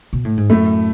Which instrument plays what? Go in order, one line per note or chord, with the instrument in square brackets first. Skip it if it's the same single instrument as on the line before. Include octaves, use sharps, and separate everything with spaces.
[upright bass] B2
A2
G#2
[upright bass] F#2 [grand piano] A2 A3